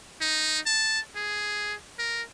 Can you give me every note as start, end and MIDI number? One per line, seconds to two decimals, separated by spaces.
0.21 0.59 63
0.66 1.00 81
1.16 1.75 68
1.99 2.22 70